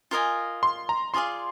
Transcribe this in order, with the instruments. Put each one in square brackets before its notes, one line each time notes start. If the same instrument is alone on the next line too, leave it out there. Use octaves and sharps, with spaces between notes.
[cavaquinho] F4 A#4 D#5 G#5
[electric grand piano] C6
A#5
[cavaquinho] F4 G#4 D5 F5 [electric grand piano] C6